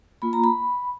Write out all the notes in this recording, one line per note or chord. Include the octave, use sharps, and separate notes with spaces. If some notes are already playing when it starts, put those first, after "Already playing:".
A#3 F4 B5
A#5
B5